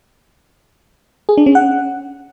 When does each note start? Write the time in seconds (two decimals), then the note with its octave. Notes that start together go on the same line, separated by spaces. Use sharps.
1.29 G#4
1.38 D4
1.46 C#4
1.55 F#5